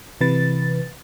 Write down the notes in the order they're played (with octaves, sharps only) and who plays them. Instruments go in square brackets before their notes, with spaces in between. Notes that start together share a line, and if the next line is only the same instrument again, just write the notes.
[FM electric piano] C3 E3 B4 A6